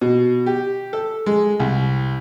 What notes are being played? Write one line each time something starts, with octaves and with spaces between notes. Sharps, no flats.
B2
G4
A4
G#3
C2